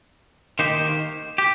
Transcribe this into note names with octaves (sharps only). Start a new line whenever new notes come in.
D#3 A#3 G4 C5
G4